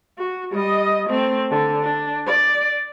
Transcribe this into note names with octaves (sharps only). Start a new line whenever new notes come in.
F#4
G3 D#5
A3 C4
D3
D4
D5